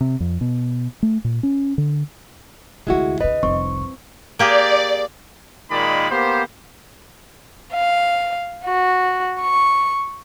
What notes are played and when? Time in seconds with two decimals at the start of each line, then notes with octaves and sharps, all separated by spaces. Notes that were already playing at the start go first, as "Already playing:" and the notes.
0.01 C3
0.20 F2
0.41 B2
1.03 A3
1.24 A#2
1.43 C#4
1.78 D3
2.87 D2 C3 G#3 E4 F#4
3.21 D2 C3 B4 D#5
3.43 F1 C2 C4 C#6
4.39 A#3 G4 G#4 D5
5.70 A#2 D#3 G#3 A#3 D5 B5
6.11 A#3 B3 G4 C5
7.73 F5
8.64 F#4
9.40 C#6